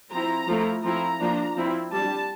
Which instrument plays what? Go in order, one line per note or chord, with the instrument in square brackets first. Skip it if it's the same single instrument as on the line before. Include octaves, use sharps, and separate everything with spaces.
[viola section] F3 C4 E4 A#5
F3 A3 E4
F3 C4 E4 A#5
F3 A#3 D4
F3 C4 E4
G3 D4 A5